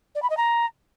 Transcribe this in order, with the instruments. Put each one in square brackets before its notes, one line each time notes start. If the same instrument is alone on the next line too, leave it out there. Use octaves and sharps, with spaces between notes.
[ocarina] D5
B5
D#5
A#5